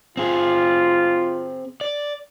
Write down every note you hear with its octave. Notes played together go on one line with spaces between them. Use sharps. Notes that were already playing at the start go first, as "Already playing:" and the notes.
C4 F4 G#4
D5